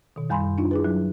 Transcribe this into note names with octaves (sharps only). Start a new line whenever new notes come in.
B2 D#3
F#2 G3 G#5 B5 C6
F#2
D4 D#4 F4
E4 G#4 B4
F#3